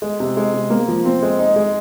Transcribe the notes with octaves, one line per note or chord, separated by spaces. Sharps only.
G#3
C3
G#3
C3
A#3
F3
C4
G#3
D#4
G#3